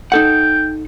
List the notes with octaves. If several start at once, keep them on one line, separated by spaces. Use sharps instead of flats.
D#4 A4 F#5 G5